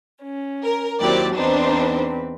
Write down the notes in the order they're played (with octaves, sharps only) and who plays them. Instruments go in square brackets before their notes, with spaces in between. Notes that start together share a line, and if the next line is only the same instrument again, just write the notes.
[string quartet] C#4
[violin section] A#4
[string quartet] D#2 F#3 E4 [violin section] C4 G4 D5
[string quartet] E2 C4 B4 [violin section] D4 D#4 C5